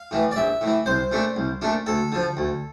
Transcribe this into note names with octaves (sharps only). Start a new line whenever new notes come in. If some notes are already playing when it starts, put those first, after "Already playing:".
Already playing: F5
A2 E3
D5
A#1 E5
A2 E3
C2 C5
A#2 A3 D4
C2
A#2 A3 D4
D2 A4
D3 F3
D2